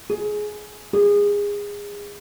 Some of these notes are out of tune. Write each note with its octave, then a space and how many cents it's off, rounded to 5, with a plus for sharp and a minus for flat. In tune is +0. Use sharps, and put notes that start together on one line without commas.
G#4 +15
G#4 -25